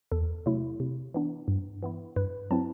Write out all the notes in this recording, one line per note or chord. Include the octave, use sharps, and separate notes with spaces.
E2 A4
C3 F#3 A3 E4
C3
E3 B3 D4
G2
E3 B3 E4
G2 B4
F#3 C4 E4 A5